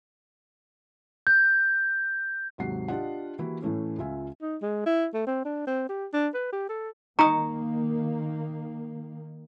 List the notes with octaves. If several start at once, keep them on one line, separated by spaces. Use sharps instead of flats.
G6
D#2 G#2 C3 F#3 F#5 C7
D4 F4 G4 D#5 F#5
E3 A#3 E4 F#4 G4
A2 E3 A3 C#4
C#2 F4 E5 G#5
D#4
G#3
E4
A3
C4
D4
C4
G4
D4
B4
G4
A4
D#3 A#3 D#4 A#5 C#6 D#6